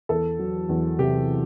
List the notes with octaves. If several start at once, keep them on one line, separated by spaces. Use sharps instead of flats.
E2 A4
F#3
E2
C3 G4